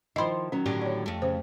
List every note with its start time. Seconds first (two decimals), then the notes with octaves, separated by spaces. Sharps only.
0.16 D#3 F3 E4 C5 D#5 B5
0.52 D#3 F#3 C#4
0.66 A2 D3 G4
0.82 C#5 D5
1.06 F2 A3
1.22 C#3 C5